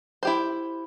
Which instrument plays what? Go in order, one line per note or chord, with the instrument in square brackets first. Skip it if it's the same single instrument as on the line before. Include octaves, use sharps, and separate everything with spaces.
[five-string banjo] E4 G4 C5